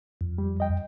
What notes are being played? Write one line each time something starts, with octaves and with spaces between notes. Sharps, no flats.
F2
G3
D#5 G5